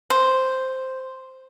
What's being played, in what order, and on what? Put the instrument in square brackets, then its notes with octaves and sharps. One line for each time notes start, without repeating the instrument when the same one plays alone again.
[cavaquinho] C5